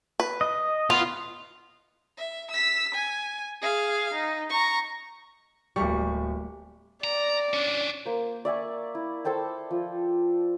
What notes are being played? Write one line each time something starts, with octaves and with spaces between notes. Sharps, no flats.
B4
D#5
B3 F4
E5
E6 B6
G#5
G#4 F5
D#4
A#5 C#6
D1 G3 A3 A#3 C#6
D5 A#5
C#4 D4
A#3 C5
D5 E5 G#5 C#6
E4
A4 C5 G5 A5
F3